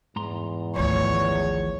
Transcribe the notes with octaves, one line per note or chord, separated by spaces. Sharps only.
E2 G#2 A#5 C6
G#1 D2 D#3 F3 C#5